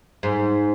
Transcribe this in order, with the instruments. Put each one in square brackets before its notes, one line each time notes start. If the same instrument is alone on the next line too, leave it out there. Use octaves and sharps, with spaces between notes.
[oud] G#2